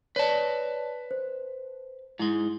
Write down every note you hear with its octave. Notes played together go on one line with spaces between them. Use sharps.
B4 C#5 D5 A5
C5
G#2 G#3 E4